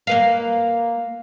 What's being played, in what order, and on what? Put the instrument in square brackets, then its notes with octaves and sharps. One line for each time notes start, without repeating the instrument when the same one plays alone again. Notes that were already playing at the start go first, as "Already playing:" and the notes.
[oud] A#3 B4 F5